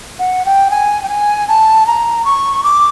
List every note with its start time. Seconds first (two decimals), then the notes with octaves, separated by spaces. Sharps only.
0.19 F#5
0.45 G5
0.71 G#5
1.03 G5
1.09 G#5
1.48 A5
1.86 A#5
2.25 C#6
2.64 D6